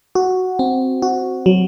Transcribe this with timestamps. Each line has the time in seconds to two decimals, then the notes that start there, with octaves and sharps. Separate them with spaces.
0.15 F#4
0.59 C4
1.02 F#4
1.46 F#3